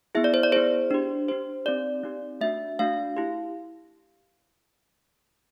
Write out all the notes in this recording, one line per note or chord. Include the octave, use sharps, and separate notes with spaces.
B3 E4 G#4 E5
D5
C5
D5
B3 E4 G#4 C5
D4 G4
D4 G4 C5
C4 D#4 G4 D5
C4 D#4 G4
A3 D4 F#4 E5
A3 D4 F#4 F5
E4 G4